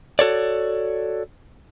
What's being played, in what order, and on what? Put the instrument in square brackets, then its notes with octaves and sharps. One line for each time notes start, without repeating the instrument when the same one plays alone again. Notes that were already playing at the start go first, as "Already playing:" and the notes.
[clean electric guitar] F#4 A4 C#5 D5